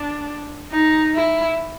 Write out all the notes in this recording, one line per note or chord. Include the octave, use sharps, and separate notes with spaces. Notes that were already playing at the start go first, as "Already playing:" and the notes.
Already playing: D4
D#4
E4